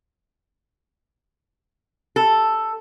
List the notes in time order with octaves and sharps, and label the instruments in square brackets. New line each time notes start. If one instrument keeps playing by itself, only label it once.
[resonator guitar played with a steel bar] A4